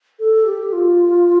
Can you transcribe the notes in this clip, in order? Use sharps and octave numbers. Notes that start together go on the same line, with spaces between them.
A4
G4
F4